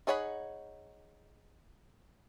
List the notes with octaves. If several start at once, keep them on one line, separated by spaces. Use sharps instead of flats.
D#4 G#4 C#5 F#5 B5